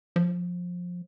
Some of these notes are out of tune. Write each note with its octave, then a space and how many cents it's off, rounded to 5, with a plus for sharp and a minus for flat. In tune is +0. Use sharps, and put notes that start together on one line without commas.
F3 +20